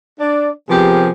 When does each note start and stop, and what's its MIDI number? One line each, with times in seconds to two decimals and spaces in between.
0.19 0.49 62
0.19 0.49 74
0.69 1.08 48
0.69 1.08 53
0.69 1.08 59
0.69 1.08 67
0.69 1.08 68
0.69 1.08 70